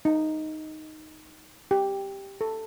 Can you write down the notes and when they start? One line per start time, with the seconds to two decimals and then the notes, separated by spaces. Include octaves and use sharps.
0.05 D#4
1.71 G4
2.41 A4